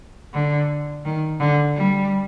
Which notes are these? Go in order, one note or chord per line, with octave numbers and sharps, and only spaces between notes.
D3
D#3
D3
G3